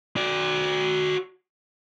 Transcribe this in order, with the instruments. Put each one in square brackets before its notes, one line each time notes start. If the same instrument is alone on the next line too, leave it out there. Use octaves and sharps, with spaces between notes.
[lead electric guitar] F#4 D5